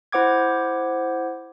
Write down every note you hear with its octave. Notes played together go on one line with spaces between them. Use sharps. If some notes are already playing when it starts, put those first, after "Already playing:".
E4 C5 F#5 D6 G#6